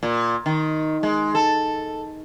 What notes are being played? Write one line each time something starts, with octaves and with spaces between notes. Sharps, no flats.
A#2
D#3
G#3
A4